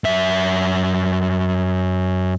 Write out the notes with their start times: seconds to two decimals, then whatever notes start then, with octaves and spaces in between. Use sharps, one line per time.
0.04 F#2 E5